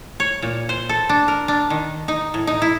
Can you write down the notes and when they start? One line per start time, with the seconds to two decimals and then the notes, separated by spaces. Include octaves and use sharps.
0.20 C#5
0.42 A#2
0.69 C5
0.89 A4
1.09 D4
1.28 A#4
1.48 D4
1.70 D#3
2.08 D#4
2.34 A2
2.47 D#4
2.62 E4